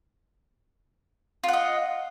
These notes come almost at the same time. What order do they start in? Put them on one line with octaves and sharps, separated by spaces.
F4 F#5 D#5